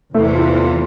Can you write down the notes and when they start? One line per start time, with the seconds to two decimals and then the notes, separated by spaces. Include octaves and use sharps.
0.14 E2 C3 E3 A3
0.35 F4
0.55 F4